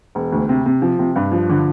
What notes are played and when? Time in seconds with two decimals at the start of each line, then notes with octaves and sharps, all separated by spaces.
0.15 E1
0.32 D2
0.49 C3
0.66 C3
0.82 F3
0.99 C3
1.16 G2
1.32 F3
1.49 D3